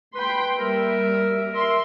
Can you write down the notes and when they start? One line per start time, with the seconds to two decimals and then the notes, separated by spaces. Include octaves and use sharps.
0.15 B4 G5 B5 C6
0.58 G3 A#3 A#4 E5
1.53 A#4 E5 C6